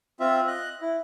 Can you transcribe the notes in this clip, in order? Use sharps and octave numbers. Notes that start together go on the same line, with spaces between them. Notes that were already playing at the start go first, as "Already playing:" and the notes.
C4 F4 E5
D#5 F#6
E4